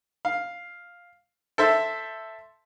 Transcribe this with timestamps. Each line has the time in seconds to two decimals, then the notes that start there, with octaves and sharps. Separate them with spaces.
0.25 F5
1.58 A4 C5 E5 A5